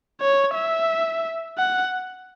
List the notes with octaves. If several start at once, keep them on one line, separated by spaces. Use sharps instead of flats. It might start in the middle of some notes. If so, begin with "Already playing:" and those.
C#5
E5
F#5